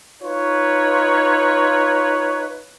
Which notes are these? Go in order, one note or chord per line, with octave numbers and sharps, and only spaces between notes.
D#4 F4 B4 C#5